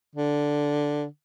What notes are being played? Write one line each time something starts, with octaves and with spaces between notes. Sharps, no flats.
D3